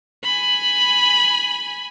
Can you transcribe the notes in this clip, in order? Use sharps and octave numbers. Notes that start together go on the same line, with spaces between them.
G#5 B5